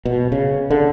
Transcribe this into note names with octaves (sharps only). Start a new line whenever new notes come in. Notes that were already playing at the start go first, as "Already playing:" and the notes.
B2
C#3
D3